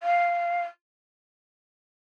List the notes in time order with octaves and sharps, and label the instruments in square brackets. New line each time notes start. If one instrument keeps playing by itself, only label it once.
[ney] F5